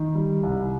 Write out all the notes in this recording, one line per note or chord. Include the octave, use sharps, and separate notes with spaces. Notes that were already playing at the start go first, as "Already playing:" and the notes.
Already playing: D#3
G3
C2